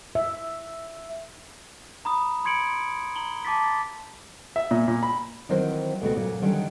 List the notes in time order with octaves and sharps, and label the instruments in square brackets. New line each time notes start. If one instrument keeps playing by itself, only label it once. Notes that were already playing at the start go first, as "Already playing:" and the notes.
[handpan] E5
[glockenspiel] A#5 B5 D#6
B5 C6 G#6 C#7 D7 F#7
A#5 F#7 G7
A5 D6 A6 B6
A6
[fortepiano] E5
A#2
A#2
B5
[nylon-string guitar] D#3 E3 F#3 C4 A#4 C5
D2 B2 A3 F#4
A#2 C#3 F#3
D3 D#3 F#3 G3 C#4 D#4